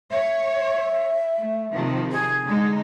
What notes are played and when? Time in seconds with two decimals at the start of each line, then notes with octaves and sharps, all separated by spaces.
0.11 C#5 E5
1.37 A3
1.72 C3 D#3 F3
2.11 G#4
2.46 D3 G#3 D#4